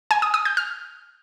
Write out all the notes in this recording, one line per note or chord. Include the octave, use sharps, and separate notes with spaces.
G#5
D#6
D#6
G6
F6